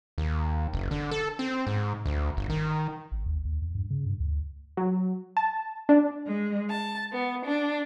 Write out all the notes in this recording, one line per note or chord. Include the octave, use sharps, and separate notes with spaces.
D#2
F#1
D3
A4
C4
G#2
D2
G1
D#3
G#1
D#2
D#2
E2
G2
C#3
G2
D2
F#3
A5
D4
G#3
A5
B3
D4